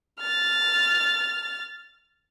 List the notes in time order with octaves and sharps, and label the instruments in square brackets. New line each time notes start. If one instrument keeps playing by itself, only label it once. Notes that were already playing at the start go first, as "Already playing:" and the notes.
[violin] F6 A6